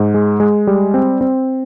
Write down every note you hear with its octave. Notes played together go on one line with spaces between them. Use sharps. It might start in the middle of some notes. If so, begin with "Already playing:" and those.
Already playing: G#2
G#3
G#3
G3
C4
C4